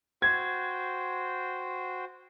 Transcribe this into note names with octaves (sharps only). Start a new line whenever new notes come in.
F#4 C5 G5 G#6